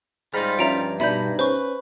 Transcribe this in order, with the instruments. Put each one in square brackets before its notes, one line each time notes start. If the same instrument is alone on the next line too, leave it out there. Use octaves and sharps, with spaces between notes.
[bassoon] G#2 [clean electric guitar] G3 D#4 F4 [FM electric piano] B5 F6
[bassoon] G2 [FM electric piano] F3 C#4 E4 [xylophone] E5 A#5 D7
[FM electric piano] B2 G3 D4 [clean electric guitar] D#4 B5 [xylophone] E5 G6
[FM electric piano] C#4 [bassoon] B4 [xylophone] C5 C#6